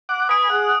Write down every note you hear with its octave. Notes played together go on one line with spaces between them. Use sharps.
F#5 D6
B4 G#5 D#6 D7
G#4 F#5